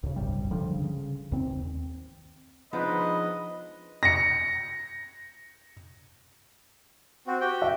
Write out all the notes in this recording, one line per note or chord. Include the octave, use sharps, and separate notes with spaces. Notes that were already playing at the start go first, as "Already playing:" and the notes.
D2 C#3
D1 G1 C2 G3
G1 D3 F3 G3
C#3
D#2 C4
F3 G#3 B3 C4 D4 D#4 B4 D#5
A#6 C#7
C4 F#4
F#4 G4 G5
E5